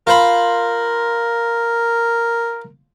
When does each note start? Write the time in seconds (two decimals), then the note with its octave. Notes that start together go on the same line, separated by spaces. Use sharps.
0.07 F4 A#4 C5 B5